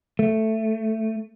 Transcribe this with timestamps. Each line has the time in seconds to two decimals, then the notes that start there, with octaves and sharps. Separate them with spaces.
0.19 A3